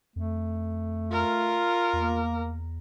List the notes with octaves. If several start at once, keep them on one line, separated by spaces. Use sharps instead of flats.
F2 A3
F4 A#4
E2 A#3